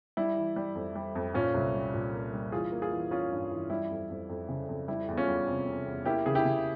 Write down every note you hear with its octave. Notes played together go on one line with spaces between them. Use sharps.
G3 E4
E3
G3
F2
G3
F2
A#2 C#4 F4
C2
G3
A#2
A#3
G3
E3 F4 G#4
A#3
F4 G#4
E3
A#3 C#4 F4
G2
E3
G3 E4
F2
F2
F2
C#3
F2
G3 E4
E2
C#4 F4
G3
C3
C3
E2
A#3 E4 G4
C#3 G#4
E4 G4
C#3